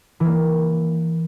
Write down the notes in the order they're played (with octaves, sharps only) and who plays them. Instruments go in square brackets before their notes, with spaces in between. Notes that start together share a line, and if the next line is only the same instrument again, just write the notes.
[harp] E3 A#3